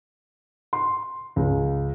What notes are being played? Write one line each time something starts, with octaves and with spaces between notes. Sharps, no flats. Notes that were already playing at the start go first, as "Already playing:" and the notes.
C6
C#2